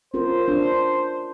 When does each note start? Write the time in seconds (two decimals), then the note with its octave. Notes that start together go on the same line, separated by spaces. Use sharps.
0.14 C#4 F4 A#4 C5
0.48 D4